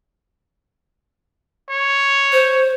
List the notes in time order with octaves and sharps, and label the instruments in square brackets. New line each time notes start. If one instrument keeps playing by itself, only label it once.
[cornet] C#5
[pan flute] C5